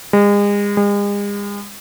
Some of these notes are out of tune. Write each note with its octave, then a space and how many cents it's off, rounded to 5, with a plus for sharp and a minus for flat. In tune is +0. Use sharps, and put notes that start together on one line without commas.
G#3 -35
G#3 -40